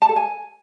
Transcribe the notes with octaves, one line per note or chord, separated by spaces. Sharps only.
A5
A4
G#5